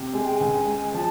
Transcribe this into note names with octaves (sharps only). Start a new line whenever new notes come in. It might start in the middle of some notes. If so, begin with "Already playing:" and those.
Already playing: C3
G#3 G#5
G5
C#2 G#5
G#3
F3 A5